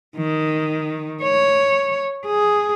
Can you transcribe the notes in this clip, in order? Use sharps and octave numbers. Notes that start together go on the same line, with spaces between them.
D#3
C#5
G#4